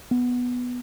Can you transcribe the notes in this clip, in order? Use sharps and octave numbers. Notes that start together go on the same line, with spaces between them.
B3